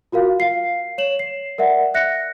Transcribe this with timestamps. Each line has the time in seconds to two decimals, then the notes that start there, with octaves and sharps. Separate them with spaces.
0.12 F4 F#4 A#4 F5
0.40 F5 C7
0.98 C#5 E7 F#7
1.19 C7
1.58 A#4 D5 E5 F#5
1.94 E5 F#6 A#6 C#7